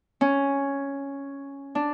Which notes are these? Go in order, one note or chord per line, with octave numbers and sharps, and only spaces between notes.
C#4
D4